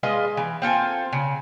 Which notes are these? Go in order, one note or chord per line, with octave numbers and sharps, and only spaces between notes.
G#3 F4 B4 D#5
E3
C4 F4 A4 G#5
C#3